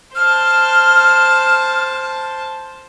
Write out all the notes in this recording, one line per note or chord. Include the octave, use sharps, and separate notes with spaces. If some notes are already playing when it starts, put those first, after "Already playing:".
C5 A5 F6